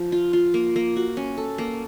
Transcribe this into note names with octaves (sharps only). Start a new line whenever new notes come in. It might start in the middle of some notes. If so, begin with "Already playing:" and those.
Already playing: F3
F4
F4
A#3
A#3
F#4
C#4
A4
A#3